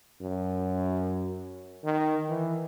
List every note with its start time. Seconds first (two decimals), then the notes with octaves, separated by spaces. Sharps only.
0.21 F#2
1.84 D#3
2.29 E3